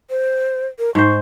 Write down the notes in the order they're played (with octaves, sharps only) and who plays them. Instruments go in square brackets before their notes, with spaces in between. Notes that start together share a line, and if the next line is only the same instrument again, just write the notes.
[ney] C5
A#4
[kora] G#2 C5 [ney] C#6